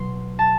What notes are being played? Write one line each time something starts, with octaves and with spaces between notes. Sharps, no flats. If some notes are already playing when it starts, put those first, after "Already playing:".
Already playing: B2 F#3 C6
A5